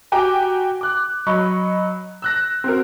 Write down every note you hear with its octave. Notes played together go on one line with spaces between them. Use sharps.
F#4 G4 G5 G#5 A#5 D6
D6 F#6
F#3 D#5 B5 C#6
E6 F#6 A#6
C4 F#4 A#4